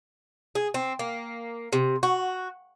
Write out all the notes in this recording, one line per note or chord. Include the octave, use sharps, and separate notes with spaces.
G#4
C4
A#3
C3
F#4